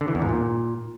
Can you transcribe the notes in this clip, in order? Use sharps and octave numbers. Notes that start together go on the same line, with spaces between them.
D3
E3
E2
G#2
A#2